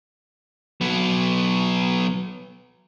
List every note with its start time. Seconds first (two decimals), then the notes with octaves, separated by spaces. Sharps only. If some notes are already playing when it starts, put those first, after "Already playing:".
0.81 F#3 B3